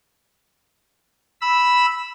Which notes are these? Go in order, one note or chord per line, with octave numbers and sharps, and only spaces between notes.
B5 E6